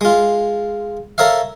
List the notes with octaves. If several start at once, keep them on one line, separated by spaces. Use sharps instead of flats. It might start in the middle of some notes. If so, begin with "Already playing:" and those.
G#3 F4
A4 A#4 C#5 E5 F5